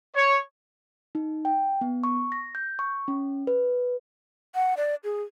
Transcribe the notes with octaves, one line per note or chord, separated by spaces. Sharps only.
C#5
D#4
G5
B3
C#6
A#6
G6
C#6
C#4
B4
F#5
D5
G#4